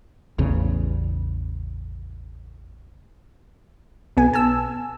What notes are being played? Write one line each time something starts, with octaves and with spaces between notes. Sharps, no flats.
A1 E2 C#3
B1 B3 G#5
G#5 A5 E6